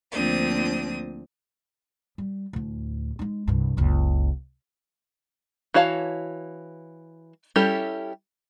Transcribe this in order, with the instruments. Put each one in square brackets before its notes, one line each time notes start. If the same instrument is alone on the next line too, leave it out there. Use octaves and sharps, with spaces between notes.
[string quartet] D2 F3 A#3 C4 D4 D#6
[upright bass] G3
D2 A2
G#3 D#4
C2 G2
F#1 C#2
[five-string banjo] E3 F#4 C#5 F5 A5
G3 C#4 E4 G4 A4